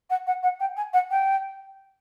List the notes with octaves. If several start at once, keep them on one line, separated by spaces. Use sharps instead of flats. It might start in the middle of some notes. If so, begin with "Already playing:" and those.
F#5
F#5
F#5
G5
G#5
F#5
G5